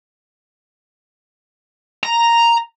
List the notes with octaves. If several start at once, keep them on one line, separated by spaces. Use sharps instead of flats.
A#5